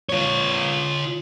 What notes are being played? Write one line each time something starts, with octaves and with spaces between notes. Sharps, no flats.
F4 C#5